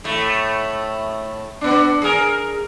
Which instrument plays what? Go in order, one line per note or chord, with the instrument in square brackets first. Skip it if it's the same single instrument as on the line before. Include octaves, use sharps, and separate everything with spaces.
[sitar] A2 A3
B3 D4
G#4 A#4